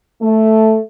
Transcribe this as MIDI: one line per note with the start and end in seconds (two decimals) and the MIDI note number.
0.22 0.80 57